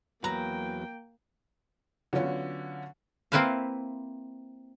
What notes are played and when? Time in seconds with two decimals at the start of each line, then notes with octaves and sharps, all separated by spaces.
0.24 E2 F#3 A#3 B4 G5 A#5
2.13 D3 F#3 B3 C#4 F4 C#5
3.32 A#3 C4 E4 B4 C5 F5